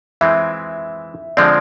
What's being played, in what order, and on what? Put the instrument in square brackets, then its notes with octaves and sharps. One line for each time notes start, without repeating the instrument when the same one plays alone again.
[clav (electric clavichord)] E3 G#3 C4 [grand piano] E5
[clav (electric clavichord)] D3 F3 G#3 C4 [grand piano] D5